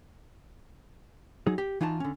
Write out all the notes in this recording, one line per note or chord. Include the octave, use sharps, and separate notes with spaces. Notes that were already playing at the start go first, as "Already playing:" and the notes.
F#3 D#4 G#4
G4
E3 D#4 F4 F#4 A5
D3 C#4